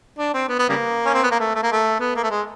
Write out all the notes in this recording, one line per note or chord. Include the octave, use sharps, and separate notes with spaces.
D4
C4
B3
B3
C#3 G3 A#3
C#4
C4
B3
A#3
A3
A3
A#3
A3
B3
A#3
A3
G#3